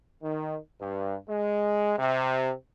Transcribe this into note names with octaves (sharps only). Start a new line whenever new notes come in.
D#3
G2
G#3
C3